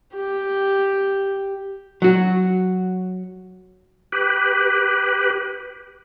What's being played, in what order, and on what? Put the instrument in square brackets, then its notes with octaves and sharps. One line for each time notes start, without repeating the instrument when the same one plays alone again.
[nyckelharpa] G4
[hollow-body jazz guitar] F#3 F#4
[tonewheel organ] G4 B4